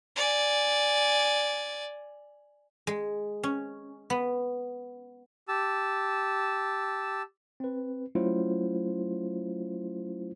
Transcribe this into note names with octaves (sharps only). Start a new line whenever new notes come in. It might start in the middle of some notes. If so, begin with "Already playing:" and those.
D5 G#5
G#3
C#4
B3
G4 A5 E6
C4 B4
F#3 A3 C#4 E4 F4 C5